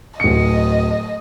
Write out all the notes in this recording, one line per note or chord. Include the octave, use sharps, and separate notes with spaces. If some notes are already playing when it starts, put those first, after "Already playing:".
D1 D#5 C#7